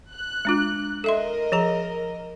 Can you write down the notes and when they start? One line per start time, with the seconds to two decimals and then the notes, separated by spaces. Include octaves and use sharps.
0.12 F#6
0.45 G#3 D4 F4
1.04 A4 A#4 D#5 E5 C6
1.52 F3 G#4 A#5